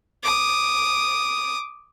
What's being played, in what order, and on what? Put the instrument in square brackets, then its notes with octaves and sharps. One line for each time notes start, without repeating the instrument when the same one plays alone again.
[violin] D6 D#6